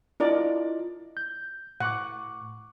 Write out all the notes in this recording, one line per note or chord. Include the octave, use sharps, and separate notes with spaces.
D4 E4 F4 A#4 D5 D#5
G6
A2 F#5 C#6 D6